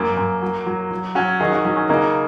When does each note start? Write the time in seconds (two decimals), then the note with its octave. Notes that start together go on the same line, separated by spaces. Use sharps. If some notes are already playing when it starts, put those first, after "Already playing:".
Already playing: F#2 F#3 A#3
0.17 F#2
0.42 F#3
0.67 F#3
0.91 F#3
1.15 F#3 C#4 F#4
1.40 D#3 D#4 G#4
1.52 C#4 F#4
1.65 F#3 C#4
1.77 C#4
1.89 C#3 A#3 D#4